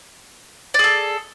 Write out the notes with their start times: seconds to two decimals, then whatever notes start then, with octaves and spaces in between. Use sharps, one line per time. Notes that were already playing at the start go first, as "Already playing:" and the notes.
0.74 D5
0.79 G#4
0.84 A4